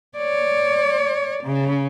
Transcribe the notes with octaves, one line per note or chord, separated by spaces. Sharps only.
C#5 D5
C#3